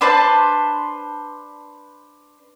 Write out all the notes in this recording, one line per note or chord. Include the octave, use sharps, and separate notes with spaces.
D4 B4 C5 A5